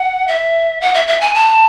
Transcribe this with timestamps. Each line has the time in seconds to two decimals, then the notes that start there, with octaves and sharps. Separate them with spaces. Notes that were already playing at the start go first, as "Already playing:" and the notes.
Already playing: F#5
0.28 E5
0.81 F#5
0.94 E5
1.07 E5
1.21 G#5
1.34 A5